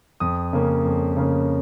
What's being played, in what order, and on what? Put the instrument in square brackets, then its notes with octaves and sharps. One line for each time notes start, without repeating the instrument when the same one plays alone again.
[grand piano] F2 D#6
C#3 A#3 C#4
F2
C#3 A#3 C#4